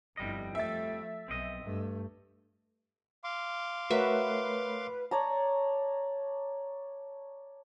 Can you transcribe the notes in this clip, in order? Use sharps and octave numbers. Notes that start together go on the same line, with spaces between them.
G1 F2 G3 E4 D#5
F3 A3 E5 A6
B1 C4 D#5
G2 A3
F5 C6 D6
A3 F#4 A#4 B4 C#5 E5
C#5 D5 A5 A#5